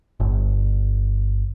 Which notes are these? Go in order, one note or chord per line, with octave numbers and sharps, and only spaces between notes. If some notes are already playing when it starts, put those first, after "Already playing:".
G1